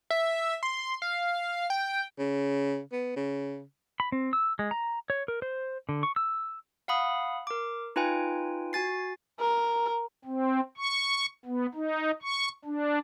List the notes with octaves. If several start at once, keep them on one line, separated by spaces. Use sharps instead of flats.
E5
C6
F5
G5
C#3
B3
C#3
B5
C4
E6
G#3
A#5
C#5
A#4
C5
D3
C#6
E6
F5 F#5 B5 D#6
A#4 D6
D#4 F4 B4 G5 G#5
F#4 G#5 A6 C7
A#4
C4
C#6
B3
D#4
C#6
D4